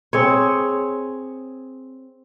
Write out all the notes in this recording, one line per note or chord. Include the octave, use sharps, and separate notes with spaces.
C4 G#4 C#5